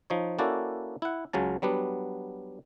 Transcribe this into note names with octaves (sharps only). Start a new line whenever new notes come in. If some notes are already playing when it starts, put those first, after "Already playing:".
F3 D#4 C#5
A#3 C#4 E4 F#4 A4 D5
E4 F#5
C#2 C#3 F#3 C#4 A5
F#3 G3 B3 D4